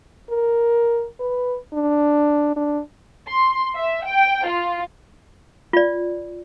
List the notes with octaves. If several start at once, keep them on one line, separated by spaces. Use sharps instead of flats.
A#4
B4
D4
D4
C6
E5
G5
F4
F4 D5